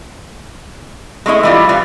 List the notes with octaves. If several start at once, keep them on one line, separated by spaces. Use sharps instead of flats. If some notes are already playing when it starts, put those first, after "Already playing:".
G#3 A3 E4 D#5
E3 G3 F4
E3 F4